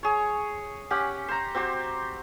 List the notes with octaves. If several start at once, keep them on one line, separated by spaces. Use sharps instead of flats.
G#4 C#5
C#4 G4 F#5
C5 A#5
C4 F#4 G4 C5